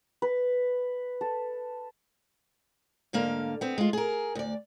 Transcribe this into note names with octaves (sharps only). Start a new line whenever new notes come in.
B4
A4
G#2 D3 A#3 F5
B3 C4
G#3 F4
G#4 A#4
D2 D5